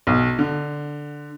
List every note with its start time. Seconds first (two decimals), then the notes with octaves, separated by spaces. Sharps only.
0.07 B1
0.39 D3